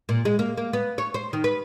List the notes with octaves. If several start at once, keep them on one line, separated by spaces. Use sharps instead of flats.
A#2
G#3
A#3
A#3
B3
C#5
C5
D#3
B4